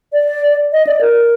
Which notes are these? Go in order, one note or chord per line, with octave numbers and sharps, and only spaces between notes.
D5
D#5
D5
A#4